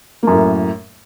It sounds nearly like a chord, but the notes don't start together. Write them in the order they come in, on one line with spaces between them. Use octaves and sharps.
A#3 F#2 A2